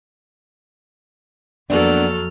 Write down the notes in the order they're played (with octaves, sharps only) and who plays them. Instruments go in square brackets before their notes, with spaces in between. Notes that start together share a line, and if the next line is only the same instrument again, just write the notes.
[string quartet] F2 F6 [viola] F#3 A4 [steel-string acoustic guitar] A#3 B3 D4